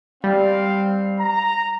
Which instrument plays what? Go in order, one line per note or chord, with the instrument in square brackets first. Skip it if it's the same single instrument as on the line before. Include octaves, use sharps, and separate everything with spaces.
[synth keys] G3 [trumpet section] C4 F5
[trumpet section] A#5